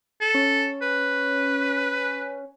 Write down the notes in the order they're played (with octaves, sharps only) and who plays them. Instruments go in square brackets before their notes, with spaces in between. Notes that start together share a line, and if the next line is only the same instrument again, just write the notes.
[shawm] A4
[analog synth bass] C#4
[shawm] B4